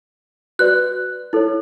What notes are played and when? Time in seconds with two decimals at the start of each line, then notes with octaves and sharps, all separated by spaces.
0.59 F#4 B4 D5 F#6
1.33 E4 A4 C#5